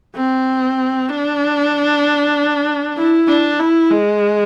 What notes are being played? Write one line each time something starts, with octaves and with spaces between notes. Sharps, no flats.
C4
D4
E4
D4
E4
G#3